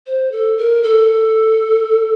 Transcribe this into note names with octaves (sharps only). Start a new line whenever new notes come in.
C5
A4
A#4
A4